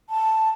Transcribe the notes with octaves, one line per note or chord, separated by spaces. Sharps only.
A5